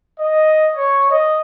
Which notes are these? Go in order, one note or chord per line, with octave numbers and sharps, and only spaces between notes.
D#5
C#5
D#5